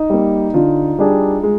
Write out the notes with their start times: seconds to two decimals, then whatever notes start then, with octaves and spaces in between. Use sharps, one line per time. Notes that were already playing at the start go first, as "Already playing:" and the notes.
Already playing: D#4
0.10 G3 A#3
0.54 D3 F4
0.99 G3 D4 G#4
1.43 G#3